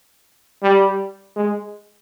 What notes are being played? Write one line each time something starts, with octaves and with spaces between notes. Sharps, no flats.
G3
G#3